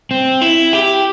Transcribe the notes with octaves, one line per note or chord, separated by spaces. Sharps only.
C4
E4
G4